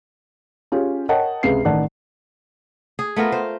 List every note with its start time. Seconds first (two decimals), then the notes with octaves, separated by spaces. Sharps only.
0.72 C#4 F4 G4 G#4
1.09 A#4 C#5 D#5 F#5 G5 A5
1.43 C#2 C3 G#4 B4 F5 C7
1.64 A1 D#3 D5 F#5 A5
2.99 G#4
3.16 A3 B3 F4 A#4
3.32 C5